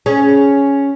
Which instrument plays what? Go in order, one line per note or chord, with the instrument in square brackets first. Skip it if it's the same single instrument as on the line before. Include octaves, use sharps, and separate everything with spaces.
[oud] C#4 G#4